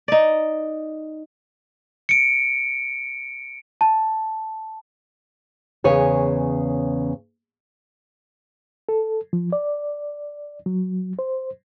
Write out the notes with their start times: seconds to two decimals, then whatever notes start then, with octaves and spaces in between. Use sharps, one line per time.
0.08 D#4 D5
2.09 C#7 D7
3.81 A5
5.84 E2 C#3 C#5 G#5
8.89 A4
9.33 F3
9.52 D5
10.66 F#3
11.19 C5